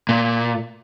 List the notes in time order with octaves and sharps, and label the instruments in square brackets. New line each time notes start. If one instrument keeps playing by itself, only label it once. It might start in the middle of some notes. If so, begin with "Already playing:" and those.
[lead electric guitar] A#2